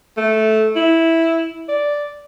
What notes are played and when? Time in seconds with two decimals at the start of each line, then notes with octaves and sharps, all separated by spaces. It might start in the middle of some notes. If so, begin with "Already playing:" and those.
0.17 A3
0.76 E4
1.69 D5